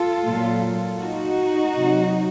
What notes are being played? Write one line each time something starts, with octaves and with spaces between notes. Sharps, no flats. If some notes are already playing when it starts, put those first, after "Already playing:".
Already playing: F4 A4
A#2 F#3
D#4 F#4
C3 F#3